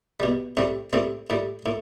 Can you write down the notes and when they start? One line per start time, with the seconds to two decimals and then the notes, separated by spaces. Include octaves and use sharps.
0.20 B2 G3
0.57 A2 G3 C4
0.93 A2 G3 C4
1.30 A2 G3
1.66 A2